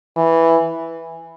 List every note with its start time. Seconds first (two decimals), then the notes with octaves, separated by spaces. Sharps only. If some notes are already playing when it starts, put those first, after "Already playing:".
0.17 E3